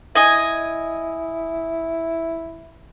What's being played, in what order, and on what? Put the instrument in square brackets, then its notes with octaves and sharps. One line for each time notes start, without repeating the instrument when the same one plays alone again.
[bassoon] E4 [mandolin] D#5 G#5